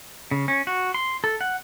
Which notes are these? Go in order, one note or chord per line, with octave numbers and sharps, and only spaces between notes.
C#3
C#4
F#4
C6
A4
F#5